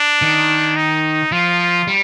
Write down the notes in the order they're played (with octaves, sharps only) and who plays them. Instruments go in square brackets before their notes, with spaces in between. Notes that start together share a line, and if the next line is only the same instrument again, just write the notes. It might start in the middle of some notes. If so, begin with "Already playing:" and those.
Already playing: [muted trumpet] D4
[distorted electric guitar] D#3
[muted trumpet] D#4
[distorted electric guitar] F3 [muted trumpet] F4
[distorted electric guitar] G3